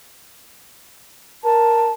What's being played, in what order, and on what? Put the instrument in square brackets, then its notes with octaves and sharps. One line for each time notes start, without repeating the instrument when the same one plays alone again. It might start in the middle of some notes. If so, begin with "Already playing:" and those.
[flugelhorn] A#4 [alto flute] A5